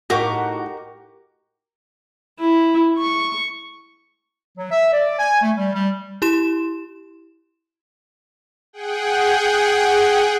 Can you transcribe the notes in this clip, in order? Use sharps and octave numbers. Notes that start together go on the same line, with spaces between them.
A2 D#4 F#4 G4 A#4 C#6 D6
E4
C#6
F#3
E5
D5
G#5
A3
G3
G3
E4 G4 C6 E7
G#4 F#5 G5